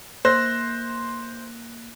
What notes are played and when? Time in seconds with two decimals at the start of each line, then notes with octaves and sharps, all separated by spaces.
0.25 A#3 C5 F#6 A#6